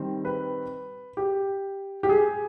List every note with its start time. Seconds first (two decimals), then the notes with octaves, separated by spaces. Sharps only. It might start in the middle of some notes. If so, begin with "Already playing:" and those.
Already playing: D#3 G3 C4
0.25 B4
1.17 G4
2.03 G4
2.09 G#4